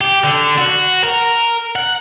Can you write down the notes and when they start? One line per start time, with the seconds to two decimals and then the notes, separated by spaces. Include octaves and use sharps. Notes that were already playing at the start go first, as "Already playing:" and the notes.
0.01 G4
0.24 D3
0.58 F#4
1.04 A#4
1.76 F#5